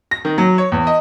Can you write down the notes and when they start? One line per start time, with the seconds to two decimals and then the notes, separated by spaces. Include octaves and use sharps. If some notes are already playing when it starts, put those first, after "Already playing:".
0.11 A#6
0.25 D#3
0.38 F#3
0.58 C#5
0.72 E2
0.87 D#5